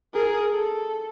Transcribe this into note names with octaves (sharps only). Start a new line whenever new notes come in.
G#4 A#4
A4